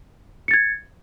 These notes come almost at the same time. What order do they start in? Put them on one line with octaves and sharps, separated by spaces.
C#7 A6 G#6